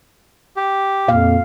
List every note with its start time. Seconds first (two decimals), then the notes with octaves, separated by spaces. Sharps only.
0.56 G4
1.08 F2 A#2 F5